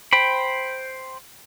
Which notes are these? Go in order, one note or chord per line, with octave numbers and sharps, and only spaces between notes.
C5 G5 B5